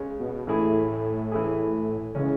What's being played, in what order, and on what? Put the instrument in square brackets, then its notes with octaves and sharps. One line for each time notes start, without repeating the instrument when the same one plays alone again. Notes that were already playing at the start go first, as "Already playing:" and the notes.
Already playing: [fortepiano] C#3 G#3 C#4
[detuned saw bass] B2
[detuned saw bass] A2 [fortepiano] E3 A3 E4 G#4
[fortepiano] E3 A3 E4 G#4
[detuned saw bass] C#3 [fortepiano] E3 G#3 C#4